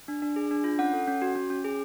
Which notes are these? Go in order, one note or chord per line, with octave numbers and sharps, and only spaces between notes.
D4
D4
G#4
D4
F4
C#4 F#5
A4
C#4
F#4
C#4
C#4
G#4